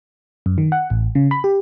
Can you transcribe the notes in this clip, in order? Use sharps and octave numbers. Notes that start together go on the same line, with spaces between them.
F#2
D#3
F#5
A1
C#3
B5
G4